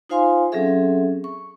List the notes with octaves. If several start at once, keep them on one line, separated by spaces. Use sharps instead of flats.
D#4 F4 C5 F5 G#5 C6
F#3 C4 C#4 G#4 A4 E5
C#6